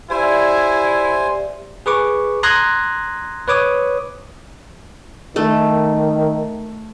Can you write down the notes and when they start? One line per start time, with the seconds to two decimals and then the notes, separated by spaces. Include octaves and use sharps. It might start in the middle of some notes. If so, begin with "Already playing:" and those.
0.10 E4 G4 C5 D5 E5 G#5
1.86 G#4 B4 C#6 D6
2.43 A#5 C6 D#6 F#6 G#6 A#6
3.48 B4 C#5 D6 D#6
5.36 D#3 A3